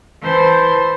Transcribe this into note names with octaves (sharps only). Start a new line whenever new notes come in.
E3 C5 A5 C6